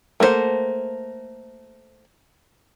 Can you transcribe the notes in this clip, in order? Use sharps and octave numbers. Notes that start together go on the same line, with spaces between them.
A3 A#3 D#4 C5 F#5